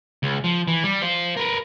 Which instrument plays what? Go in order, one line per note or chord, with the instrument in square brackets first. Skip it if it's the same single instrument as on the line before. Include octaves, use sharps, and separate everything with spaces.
[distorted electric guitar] C#2
F3
E3
G3
C5 F5
A#4 B4